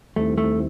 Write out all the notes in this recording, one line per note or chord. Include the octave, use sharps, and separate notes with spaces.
D#2 D#3 G3 A3 C4 E4
A3